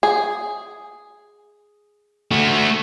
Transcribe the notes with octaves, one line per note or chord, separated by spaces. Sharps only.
G#4
A3 F#4